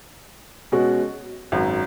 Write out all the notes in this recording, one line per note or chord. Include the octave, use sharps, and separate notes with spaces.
B2 G#3 C#4 F#4
G#1 F#2 F#3